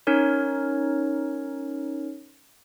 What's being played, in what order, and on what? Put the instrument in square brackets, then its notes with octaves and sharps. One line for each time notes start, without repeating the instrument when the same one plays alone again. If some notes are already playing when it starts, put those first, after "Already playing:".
[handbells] C#4 D#4 A#4 C#5